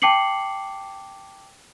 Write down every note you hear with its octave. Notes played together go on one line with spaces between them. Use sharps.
G5 A5 D6 C7 C#7 F#7